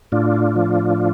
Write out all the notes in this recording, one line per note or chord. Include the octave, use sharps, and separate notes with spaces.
A2 D4 F4
F3